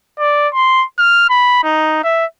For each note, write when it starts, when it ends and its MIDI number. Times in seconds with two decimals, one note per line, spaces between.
0.19 0.48 74
0.54 0.85 84
0.99 1.29 89
1.30 1.63 83
1.64 2.03 63
2.04 2.25 76